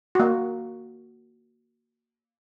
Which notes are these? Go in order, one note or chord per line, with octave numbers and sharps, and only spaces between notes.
A#3 F#4